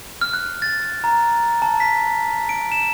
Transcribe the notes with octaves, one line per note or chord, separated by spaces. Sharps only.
F6
F#6
A6
A#5
A5
B6
D7
E7